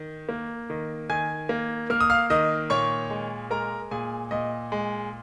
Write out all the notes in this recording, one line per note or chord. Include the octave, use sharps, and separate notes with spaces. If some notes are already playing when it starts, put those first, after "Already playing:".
Already playing: D#3
A#3
D#3
D#3 G#5 G#6
A#3
A#3 F6
D#6
F5 F6
D#3 D#5 D#6
A#2 C#5 C#6
G#3
G#3 A#4 A#5
A#2 G#4 G#5
A#2 D#5
G#3